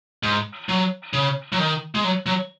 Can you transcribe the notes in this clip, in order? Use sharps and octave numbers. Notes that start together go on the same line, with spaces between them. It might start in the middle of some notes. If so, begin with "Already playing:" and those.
G#2
F#3
C#3
F#3
D#3
G#3
F#3
F#3